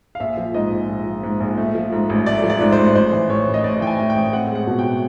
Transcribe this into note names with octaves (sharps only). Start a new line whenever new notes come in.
F5
A#1 E5
F3
G#2 D#5
A#1
A#1
F3
G#2
A#1
A3
F3
G#2
A1
A3 D5
F3
D5
G#2
C5
A1
A1 C5
E3
A2 C#5
A1
D#5
A1 D5
E3 G5
G#5
A2
G5
A1
C4 F#5
G#3
F#5
B2
G5